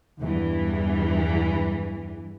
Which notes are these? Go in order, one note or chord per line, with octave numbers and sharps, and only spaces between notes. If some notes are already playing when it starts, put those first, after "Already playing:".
E2 G2 E3